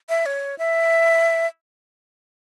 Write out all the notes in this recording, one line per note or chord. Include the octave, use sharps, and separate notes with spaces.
E5
C#5
E5